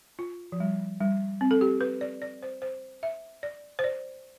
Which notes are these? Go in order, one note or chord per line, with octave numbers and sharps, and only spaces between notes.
F4
F3
G3
G3
C4
A4
G4
B4
D5
D5
C5
C5
E5
D5
C5
D5